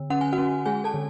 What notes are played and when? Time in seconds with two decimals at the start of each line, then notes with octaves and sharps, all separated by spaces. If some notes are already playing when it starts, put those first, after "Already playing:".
Already playing: D3
0.10 C#4 F#5
0.21 G#5
0.33 F#4 F#5
0.38 C#4
0.66 G#3 G#4 G#5
0.84 A4 A5
0.94 D3